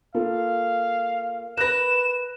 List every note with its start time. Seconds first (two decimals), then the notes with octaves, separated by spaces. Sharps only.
0.15 A#3 F4 A4 F5
1.57 A#4 B4 F#6 A#6 E7